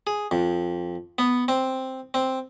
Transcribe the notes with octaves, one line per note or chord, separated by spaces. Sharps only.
G#4
F2
B3
C4
C4